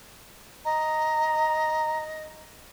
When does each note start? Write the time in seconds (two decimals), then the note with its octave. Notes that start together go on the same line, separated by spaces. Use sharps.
0.65 D#5 A#5